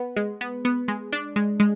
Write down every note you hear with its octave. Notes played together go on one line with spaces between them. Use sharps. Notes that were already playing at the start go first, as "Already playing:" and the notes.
Already playing: B3
G#3
B3
B3
G#3
D4
G#3
G#3